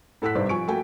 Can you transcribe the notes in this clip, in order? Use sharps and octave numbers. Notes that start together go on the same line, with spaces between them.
A2 A4 F#5 E6 F#6 B6
G#1 G2 C3 C5 D5
F3 G#5 C#6 D7
A3 A#3 F#4 G5 G#5